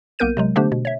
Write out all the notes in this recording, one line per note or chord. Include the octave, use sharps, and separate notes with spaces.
B1 A#3 B3 A#4 G6 D#7
C3 F#3 G#3
D3 A3 B3 D4 G4 C5
B2
C#5 E5